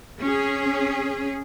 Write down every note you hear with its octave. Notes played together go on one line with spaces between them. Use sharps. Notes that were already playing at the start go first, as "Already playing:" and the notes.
C#4 G#4